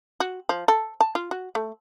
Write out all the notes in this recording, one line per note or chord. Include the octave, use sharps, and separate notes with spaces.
F#4
F3
A4
A5
F4
F#4
A3